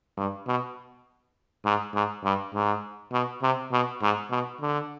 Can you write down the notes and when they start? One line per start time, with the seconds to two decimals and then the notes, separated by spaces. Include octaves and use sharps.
0.18 G2
0.47 B2
1.65 G#2
1.94 G#2
2.24 G2
2.54 G#2
3.12 B2
3.42 C3
3.72 B2
4.02 G#2
4.31 B2
4.61 D3